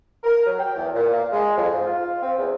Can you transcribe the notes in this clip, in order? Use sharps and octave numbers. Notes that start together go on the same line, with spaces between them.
A#4
F#3
G5
E2
A#2
A#3
G#3
F2
G#2
F4
C4
E2